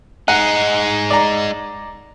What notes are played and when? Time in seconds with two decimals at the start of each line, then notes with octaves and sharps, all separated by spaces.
0.28 G#3 D#4 F#5
1.10 D5 A#5